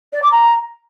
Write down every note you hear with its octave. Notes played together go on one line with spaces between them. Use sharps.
D5
D6
A#5